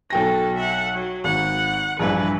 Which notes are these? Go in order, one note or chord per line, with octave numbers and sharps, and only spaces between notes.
B1 F#4 A4 G5 A#6
E5 F#5
F#3
G#1 F#5
A#1 G2 E3 B4